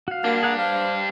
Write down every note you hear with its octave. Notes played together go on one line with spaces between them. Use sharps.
F#4 F5
G2 A#3 D4
G#4 F#5 A#5
C5 F5